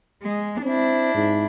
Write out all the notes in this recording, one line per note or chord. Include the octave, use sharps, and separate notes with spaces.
G#3
C4 D4 E4
G#2